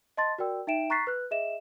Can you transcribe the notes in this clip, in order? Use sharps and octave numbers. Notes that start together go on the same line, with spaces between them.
D#5 A5 C6 A6
F#4 A#4 D5 G5 E6
D#4 E5 G5 D7 E7
A#5 C#6 F#6 A6 B6 C7
B4 F#6
G#4 D#5 E5 E7